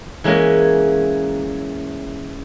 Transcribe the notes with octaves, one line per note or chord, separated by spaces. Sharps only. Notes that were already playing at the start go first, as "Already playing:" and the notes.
E3 G#3 A#3 C#4